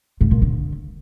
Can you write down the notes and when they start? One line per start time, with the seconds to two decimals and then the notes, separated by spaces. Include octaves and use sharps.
0.21 G#2
0.31 A#2
0.42 D3